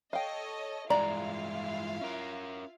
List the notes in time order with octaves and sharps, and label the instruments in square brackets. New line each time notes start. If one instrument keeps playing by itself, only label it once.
[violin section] A4 C#5 D#5 [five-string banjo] F5 G5
[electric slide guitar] G2 E3 G#3 [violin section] E4 F4 F5 [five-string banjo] D5 [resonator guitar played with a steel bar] A#5
[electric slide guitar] C#4 A#4